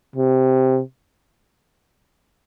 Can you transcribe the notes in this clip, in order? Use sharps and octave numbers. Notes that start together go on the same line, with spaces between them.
C3